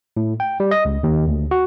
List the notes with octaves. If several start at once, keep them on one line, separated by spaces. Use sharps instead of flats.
A2
G5
G3
D#5
C#2
D#2
D2
F#4